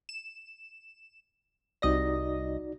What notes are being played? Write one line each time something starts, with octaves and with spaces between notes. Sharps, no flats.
E7
C2 D#4 F#4 D5 D#5 A#6